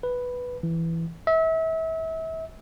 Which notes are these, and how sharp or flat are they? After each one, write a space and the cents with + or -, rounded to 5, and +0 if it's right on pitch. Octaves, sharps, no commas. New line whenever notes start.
B4 +0
E3 +5
E5 -30